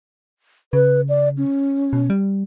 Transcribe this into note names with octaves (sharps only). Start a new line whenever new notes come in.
C#3 B4
D5
C#4
B2
G3